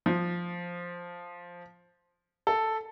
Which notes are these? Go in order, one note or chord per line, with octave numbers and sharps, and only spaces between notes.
F3
A4